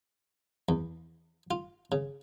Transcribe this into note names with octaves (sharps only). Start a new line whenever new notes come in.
E2
F4
C#3